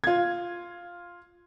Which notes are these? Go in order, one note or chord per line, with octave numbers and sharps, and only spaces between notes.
F4 G#6